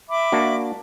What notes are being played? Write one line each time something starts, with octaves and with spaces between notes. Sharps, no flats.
E5 B5 D6
A#3 D4 F#4